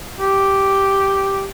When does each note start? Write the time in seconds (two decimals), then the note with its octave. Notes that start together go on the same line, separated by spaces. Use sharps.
0.19 G4